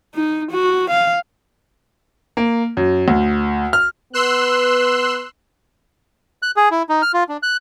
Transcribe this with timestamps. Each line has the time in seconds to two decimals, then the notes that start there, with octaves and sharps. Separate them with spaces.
0.14 D#4
0.51 F#4
0.90 F5
2.37 A#3
2.77 F#2
3.08 D2
3.73 F6
4.13 B3 B4 C6 E6 F#6
6.42 F#6
6.56 G#4
6.71 E4
6.89 D#4
7.02 F6
7.13 F4
7.29 D4
7.43 F#6